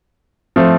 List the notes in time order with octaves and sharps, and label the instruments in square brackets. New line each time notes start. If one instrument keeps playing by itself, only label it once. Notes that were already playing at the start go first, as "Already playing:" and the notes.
[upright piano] F3 A3 C4